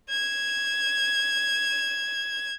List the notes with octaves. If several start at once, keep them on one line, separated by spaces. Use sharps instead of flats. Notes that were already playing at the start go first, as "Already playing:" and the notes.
G#6 E7